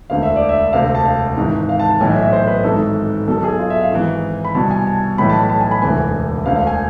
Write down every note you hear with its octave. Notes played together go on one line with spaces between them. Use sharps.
E1 D2 D3 F5
E5
D5
E5
E1 D2 C3 F5
F5
A5
F5
G#1 G#2 E3
F5
A5
A5
B1 A2 E3 G#5
E5
E5
C5
B4
G#1 G#2 E3 A4
B1 B2 A4
A4
G#4
F4
E5
F5
G#1 G#2 E3
B5
C2 B2 A5
G#5
A5
B1 A2 E3 B5
A5
B5
A5
G#5
B5
E1 D2 C3 E3 G#5
E1 D2 D3 F5
F5
G#5